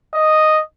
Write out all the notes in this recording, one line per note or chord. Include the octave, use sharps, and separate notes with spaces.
D#5